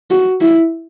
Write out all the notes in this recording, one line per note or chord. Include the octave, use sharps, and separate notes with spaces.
F#4
E4